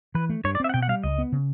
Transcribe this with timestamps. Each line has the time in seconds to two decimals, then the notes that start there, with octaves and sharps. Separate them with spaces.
0.15 E3 B4
0.29 A3
0.44 G2 C#5
0.55 D5
0.60 C4 E5
0.69 F#5
0.74 B2 G5
0.82 F#5
0.88 G3 F5
1.04 C#2 D#5
1.18 B3
1.32 C#3